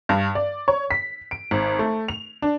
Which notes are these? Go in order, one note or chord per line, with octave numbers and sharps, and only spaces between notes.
G2
D5
C#5
B6
D7
G#1
A3
F7
D4